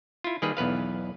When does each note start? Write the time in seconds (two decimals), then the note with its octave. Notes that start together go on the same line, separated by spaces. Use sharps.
0.24 E4 F4
0.42 D#3 G3 A#3 G#4 B4
0.57 B1 E2 B4 F5